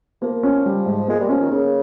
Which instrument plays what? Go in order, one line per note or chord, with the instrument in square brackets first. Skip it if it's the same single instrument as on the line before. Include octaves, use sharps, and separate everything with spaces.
[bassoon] F3 [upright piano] A#3
[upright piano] C#4
G3
G#2
[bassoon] G#3 [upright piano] A#3
[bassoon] G3
[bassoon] F3 [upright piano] C#4
[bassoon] D#3
[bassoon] C#3 [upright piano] A#3